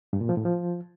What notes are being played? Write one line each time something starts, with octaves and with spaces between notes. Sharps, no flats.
G2
A#2
F3
A2
F3